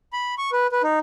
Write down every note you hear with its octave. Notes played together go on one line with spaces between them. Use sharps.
B5
C#6
B4
B4
D#4